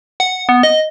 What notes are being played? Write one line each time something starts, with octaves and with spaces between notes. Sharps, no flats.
F#5
B3
D#5